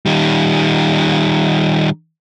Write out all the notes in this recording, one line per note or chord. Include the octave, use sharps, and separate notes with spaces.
D#3 G3